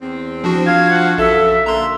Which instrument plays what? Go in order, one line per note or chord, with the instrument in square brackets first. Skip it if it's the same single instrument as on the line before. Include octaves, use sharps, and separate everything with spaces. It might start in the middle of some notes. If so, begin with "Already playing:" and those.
[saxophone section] E2 C4
[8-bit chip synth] F3 D4 F#4
[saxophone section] F4 F5 [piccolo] G#6
[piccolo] F#5
[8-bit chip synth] A#1 [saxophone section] F#2 D#4 A4 [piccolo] E5
[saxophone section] D3 A#3 [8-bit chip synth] A#5 C6